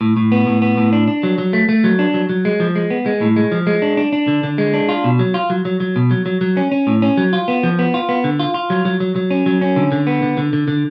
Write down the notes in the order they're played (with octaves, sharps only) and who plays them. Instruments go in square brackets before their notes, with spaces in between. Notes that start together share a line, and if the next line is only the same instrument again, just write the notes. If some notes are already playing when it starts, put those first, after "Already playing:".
[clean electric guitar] A2
A2
B3
A2
B3
A2
D4
D4
F#3
F#3
A3
A3
F#3
D4
F#3
F#3
G#3
F3
G#3
B3
G#3
A2
G#3
F3
G#3
D4
D4
D4
D3
D3
G#3
D4
F4
B2
F#3
F4
F#3
F#3
F#3
B2
F#3
F#3
F#3
C#4
C#4
A2
C#4
F#3
F4
B3
F3
B3
F4
B3
D3
F4
F4
F#3
F#3
F#3
F#3
C#4
F#3
C#4
D3
D3
B3
D3
D3
D3
D3